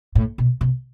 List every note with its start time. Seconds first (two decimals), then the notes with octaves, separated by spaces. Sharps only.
0.15 A2
0.38 B2
0.61 C3